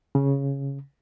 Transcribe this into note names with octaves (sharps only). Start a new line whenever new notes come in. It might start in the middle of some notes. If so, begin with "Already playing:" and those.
C#3